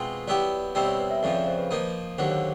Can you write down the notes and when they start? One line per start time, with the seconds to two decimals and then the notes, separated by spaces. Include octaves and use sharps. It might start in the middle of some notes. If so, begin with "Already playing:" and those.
Already playing: B2 G#3 C4 F4
0.28 F#3 B3 E4 G4 D5
0.75 B2 G3 C4 E4 D5
0.87 C#5
0.99 B4
1.11 E5
1.23 F2 C#3 F3 D5
1.35 C#5
1.47 C5
1.58 B4
1.71 F3 A#3 D#4
2.18 D#2 D3 F#3 C5
2.30 C#5